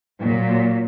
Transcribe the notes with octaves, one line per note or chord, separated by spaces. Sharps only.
A#2 F#3